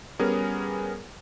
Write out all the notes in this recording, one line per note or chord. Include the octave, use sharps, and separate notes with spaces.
G3 B3 C#4 G#4 A#4